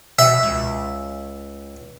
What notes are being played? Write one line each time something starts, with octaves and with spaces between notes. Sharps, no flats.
B2 E5
C#2